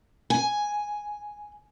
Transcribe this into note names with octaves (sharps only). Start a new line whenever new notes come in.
G#5